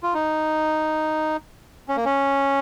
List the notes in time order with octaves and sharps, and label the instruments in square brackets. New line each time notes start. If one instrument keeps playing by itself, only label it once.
[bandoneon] F4
D#4
C#4
A#3
C#4